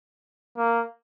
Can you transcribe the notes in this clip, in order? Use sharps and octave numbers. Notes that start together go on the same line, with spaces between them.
A#3